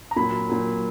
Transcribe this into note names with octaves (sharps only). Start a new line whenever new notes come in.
A#5
A#2 F#3 B5
A#2 F#3